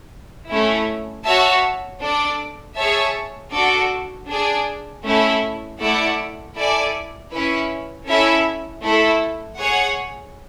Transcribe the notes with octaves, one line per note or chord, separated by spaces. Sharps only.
A3 C#4 E4
F#4 C#5 E5 A5
D4 A4 D5
G#4 C#5 E5 A5
D4 F#4 A4 D5
D4 G#4 D5
A3 C#4 E4 A4
A3 E4 A4 D5 F#5
E4 A4 D5 G#5
C#4 E4 B4
C#4 E4 A4 E5
A3 E4 A4
G#4 C#5 F#5